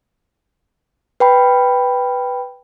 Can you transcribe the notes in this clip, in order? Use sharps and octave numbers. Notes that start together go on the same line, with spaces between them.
B4 G5 B5